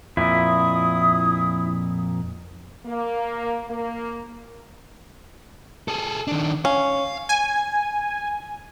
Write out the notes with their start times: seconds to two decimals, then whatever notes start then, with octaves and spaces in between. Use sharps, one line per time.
0.17 F2 A#2 E4 D#6
2.86 A#3
3.69 A#3
5.88 G#4 A4
6.27 D#3 D4
6.65 C#4 F5
7.29 G#5